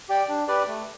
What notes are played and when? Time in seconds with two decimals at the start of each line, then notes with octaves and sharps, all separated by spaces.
0.09 G4 D5 G5
0.29 D4
0.48 G4 B4 D5
0.67 A3